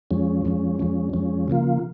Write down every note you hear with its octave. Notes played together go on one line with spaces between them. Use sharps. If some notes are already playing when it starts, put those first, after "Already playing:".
F2 F3 G#3 C#4
F2 F3 G#3 C#4
F2 F3 G#3 C#4
F2 F3 G#3 C#4
C#3 F3 A#3 F4